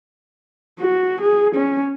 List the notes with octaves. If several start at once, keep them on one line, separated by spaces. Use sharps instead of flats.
F#4
G#4
C#4